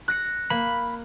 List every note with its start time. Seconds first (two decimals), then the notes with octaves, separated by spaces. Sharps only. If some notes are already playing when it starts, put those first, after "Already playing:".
0.08 F#6 A#6 C#7
0.50 A#3 B5